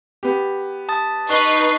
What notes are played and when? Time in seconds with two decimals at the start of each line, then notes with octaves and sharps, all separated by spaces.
0.23 B3 G4
0.89 A5 D#6 A6
1.29 D#4 B4 C#6 F#6 C7 G7